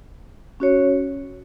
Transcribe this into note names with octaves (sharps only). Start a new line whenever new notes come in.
C#4 F#4 C#5